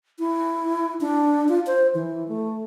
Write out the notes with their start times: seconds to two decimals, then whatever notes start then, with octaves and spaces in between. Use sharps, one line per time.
0.19 E4
1.01 D4
1.49 F4
1.67 C5
1.95 E3
2.28 A3